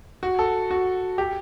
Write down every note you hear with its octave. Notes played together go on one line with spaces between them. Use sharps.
F#4
A4
F#4
G4